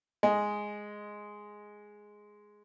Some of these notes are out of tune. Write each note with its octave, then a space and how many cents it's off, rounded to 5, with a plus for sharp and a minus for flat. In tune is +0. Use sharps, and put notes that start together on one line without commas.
G#3 +0 D#5 +0